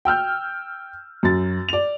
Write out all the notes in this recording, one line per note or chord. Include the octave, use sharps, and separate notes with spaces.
G5 E6 F6 G6
F#2 A6
D5 F7